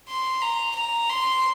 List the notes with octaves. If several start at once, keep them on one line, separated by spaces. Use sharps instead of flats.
C6
A#5
A#5
C6